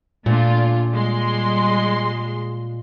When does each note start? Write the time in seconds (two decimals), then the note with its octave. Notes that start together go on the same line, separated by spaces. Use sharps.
0.26 A#2 A3 D4 F4
0.91 G3 G#3 C6